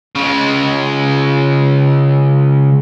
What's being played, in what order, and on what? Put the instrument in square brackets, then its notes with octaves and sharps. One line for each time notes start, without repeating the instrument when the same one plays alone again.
[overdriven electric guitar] C#3 G#3